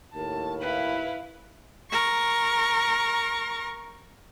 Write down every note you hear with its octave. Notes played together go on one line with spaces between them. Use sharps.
D#2 A2 A#4 A5
E4 B4 F5
A#4 C#6